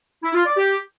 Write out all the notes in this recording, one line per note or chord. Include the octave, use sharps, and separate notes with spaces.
E4
F4
D5
G4